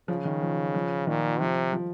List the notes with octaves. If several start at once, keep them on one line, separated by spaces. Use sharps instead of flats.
C#3 F3
D#3
F3
F3
A#2 D#3
C3 F3
F3